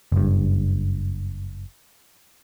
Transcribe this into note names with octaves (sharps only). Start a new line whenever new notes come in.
F#1 G2